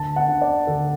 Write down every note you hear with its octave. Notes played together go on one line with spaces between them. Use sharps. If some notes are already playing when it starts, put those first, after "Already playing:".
Already playing: D2 A5
F#5
D3
D5
D2 A4